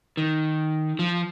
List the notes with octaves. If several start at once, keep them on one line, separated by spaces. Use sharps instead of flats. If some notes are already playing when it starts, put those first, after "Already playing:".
D#3
F3